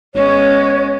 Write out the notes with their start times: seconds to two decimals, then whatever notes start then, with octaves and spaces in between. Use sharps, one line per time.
0.15 G#1 G#3 B3 C#4 C#5